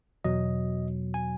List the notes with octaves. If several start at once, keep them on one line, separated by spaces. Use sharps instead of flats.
E2 B2 F#3 D#5
G#5